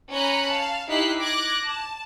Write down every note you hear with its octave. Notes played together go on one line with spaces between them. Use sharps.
C#4 G#5 A#5 B5 F#6 C#7
F5 A5
D#4 E4 G4 F#6 B6 C7
D6 F#6 G#6 A#6
A5